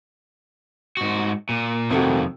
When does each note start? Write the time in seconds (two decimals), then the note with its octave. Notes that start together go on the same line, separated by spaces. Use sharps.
0.97 G#2 F#4
1.49 A#2
1.90 F2 C3 D#3 A3 F#4